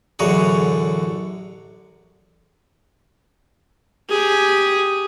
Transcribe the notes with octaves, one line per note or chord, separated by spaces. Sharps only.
A1 F#2 D3 F#4 G#4
G4 G#4